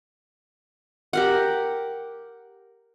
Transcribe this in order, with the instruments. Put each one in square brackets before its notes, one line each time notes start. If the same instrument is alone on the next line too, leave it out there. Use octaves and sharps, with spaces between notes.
[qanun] G4 A#4 F#5